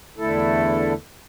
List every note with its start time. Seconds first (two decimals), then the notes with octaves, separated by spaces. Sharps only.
0.17 E2 D3 A3 E4 A4